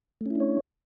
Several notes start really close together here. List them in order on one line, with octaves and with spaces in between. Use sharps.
A3 C#4 E4 D4 C#5